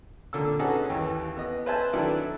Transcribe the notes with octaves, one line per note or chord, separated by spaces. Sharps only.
A#2 D3 A4 E6
C#4 D#4 F#4 G#4 A4 B4
D#2 E3
B3 D#5
B4 C5 E5 G#5 A5
D#3 F#3 D4 E4 A4 B4